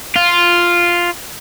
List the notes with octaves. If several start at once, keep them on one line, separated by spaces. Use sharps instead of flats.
F4